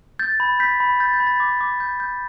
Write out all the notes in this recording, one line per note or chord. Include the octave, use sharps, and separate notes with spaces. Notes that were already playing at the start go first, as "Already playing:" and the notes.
G6 A6
B5
G6 B6
B5
G6 A6
G6
B5
A6
D6
D6
G6
G6